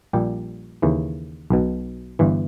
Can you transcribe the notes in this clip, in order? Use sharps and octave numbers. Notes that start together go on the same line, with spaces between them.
A#1 A#2 G3 G4
D#2 C#3 E3
B1 B2
G1 G2 E3